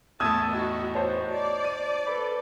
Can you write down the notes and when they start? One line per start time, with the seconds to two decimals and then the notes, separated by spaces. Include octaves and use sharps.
0.20 E2 A2 A3 A5 D#6 E6 G#6
0.53 D#4 F#4 D#5
0.94 F#4 C5 C#5 A5
1.32 D5
1.65 D#7
2.07 A4 B4 B5